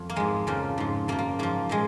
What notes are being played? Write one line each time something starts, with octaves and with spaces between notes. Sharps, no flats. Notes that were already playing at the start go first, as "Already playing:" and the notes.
Already playing: F2
A#3
G#2 F3 G#3
F2 C#3 F3 A#3
G#2 F3
F#2 F3 A#3
A#3
G#2 F3 A#3
A#2 F3 G#3